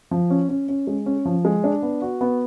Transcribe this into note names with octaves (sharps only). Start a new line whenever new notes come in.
F3
C#4
C#4
C#4
G#3
C#4
F3
G#3
D4
B3
F#4
B3